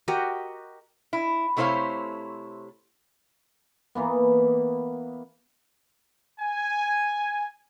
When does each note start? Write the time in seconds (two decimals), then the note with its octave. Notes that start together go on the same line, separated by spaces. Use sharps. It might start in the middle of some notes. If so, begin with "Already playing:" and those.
0.08 F#4 G4 A#4 D#5
1.13 E4
1.57 C3 A3 E4 C5 C#5 F5
3.95 E3 A#3 B3
6.40 G#5